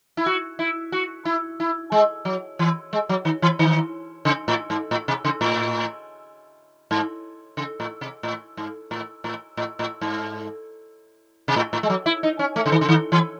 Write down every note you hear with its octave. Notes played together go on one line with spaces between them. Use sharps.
E4
F#4
E4
F#4
E4
E4
G#3
F#3
E3
G#3
F#3
D#3
E3
D#3
C#3
A2
G#2
A2
C3
C#3
A2
G#2
C#3
A2
C3
A2
G#2
A2
A2
A2
A2
G#2
C3
A2
A2
G#3
F#3
E4
D#4
C#4
A3
C#3
D#3
C#3
D#3
E3